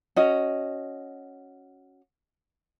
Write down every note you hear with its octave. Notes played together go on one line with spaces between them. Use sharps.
C#4 F#4 D#5